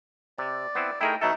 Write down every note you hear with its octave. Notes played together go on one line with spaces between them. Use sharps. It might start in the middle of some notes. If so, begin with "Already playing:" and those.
C3 D5
B3 C4 E4
A3 D#4 E4 G#4 A#4 G5
B2 F#3 D#4 A4 E5